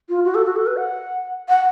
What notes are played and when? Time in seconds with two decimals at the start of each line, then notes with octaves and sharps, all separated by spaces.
0.09 F4
0.25 F#4
0.35 A4
0.46 F#4
0.56 A4
0.67 B4
0.77 F#5
1.49 F#5